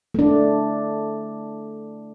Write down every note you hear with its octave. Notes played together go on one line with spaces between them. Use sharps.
A3 D4